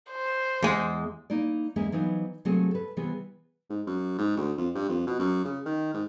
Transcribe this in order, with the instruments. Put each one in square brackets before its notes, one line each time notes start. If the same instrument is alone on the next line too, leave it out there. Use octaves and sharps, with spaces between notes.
[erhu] C5
[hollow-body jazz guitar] E2 G#3
[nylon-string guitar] A#3 D#4 E4 D5
E2 G#3 A#3 C#4 G#4 E5
E3 F#3 B3 D#4 C5 F5
C3 F#3 A3 A#3 C4 G#4
A4 B4
C3 E3 G3 B3 G#4
[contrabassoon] G#2
F#2
G#2
D2
F2
G2
F2
B2
F#2
C#3
D#3
G#2